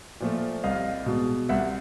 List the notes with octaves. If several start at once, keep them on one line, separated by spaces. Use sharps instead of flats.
A#2 F3 A3
C2 D#5 F5
B2 G#3
C2 E5 F#5